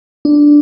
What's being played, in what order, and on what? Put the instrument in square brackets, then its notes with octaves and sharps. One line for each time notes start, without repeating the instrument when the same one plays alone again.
[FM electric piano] D4